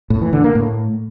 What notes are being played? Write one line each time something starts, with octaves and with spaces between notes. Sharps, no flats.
A2
E3
D3
A#3
A2